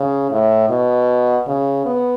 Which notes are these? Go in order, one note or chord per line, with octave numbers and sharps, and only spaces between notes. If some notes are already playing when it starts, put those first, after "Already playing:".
Already playing: C#3
A2
B2
C#3
B3